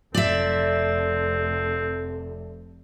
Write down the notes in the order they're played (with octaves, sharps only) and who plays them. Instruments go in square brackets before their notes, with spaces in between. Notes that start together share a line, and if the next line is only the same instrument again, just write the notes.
[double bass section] F1 C3 [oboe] C4 [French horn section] A4 [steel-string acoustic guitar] D5 E5